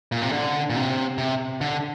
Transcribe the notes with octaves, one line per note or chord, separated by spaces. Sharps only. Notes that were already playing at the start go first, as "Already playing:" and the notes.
A#2
C3
D3
A#2
C3
C3
D3